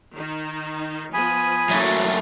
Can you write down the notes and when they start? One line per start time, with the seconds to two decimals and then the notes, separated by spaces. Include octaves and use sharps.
0.15 D#3 D#4
1.14 F3 B3 G#5 B5 D#6
1.69 F#2 E3 F#3 A3 A#3